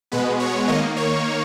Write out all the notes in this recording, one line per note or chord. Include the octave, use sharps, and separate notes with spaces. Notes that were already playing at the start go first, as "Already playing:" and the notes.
B2 G#3 B3 B4
C#5
D#3 A#3 D#5
C#5